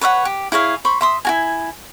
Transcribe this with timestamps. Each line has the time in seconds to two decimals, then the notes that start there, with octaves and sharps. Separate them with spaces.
0.01 B4 C#5 E5 F#5
0.25 G4
0.52 E4 G#4 C#5 F5
0.85 C5 B5 C#6
1.01 E5 C6 D#6
1.25 E4 F#4 G#5